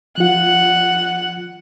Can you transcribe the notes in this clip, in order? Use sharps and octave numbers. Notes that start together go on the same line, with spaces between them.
F3 F4 F#5